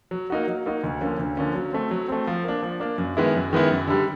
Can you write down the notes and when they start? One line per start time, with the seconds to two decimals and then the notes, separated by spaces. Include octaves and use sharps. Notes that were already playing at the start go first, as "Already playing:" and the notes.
0.11 F#3
0.30 A#3 D#4 F#4
0.47 F#3
0.66 A#3 D#4 F#4
0.84 D2
1.01 D3 F3 A#3 C#4
1.19 D2
1.37 D3 F3 A#3 C#4
1.55 F#3
1.73 A3 C4
1.91 F#3
2.08 A3 C4
2.27 F3
2.45 A#3 D4
2.63 F3
2.80 A#3 D4
2.98 F#2
3.17 D#3 G#3 B3 E4
3.35 F#2
3.53 D#3 G#3 B3 E4
3.71 F#2
3.88 D3 G3